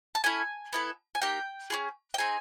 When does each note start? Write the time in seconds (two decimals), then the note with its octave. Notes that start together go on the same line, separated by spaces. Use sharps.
0.15 A5
0.24 C#4 E4 A4 G#5
0.73 B3 E4 A4
1.15 G#5
1.22 A#3 D#4 G4 G5
1.70 C#4 F4 G#4
2.14 G5
2.18 C4 D#4 G#4 G#5